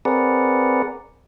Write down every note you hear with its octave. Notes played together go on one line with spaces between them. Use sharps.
C4 G#4 A#4 B4 D5 F#5